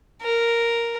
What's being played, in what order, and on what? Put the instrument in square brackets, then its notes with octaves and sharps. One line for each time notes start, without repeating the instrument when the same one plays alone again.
[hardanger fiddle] A#4